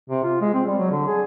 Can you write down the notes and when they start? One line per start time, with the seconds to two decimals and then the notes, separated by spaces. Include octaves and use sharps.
0.10 C3
0.24 F4
0.41 G#3
0.53 C4
0.66 G3
0.78 F#3
0.91 D3
1.07 G#4